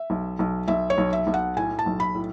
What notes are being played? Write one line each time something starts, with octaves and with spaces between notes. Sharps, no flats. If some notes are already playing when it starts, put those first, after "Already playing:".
Already playing: E5
B1
B1
B1 E5
C#5
B1
E5
B1
F#5
A2 G#5
A5
B1
B5
A2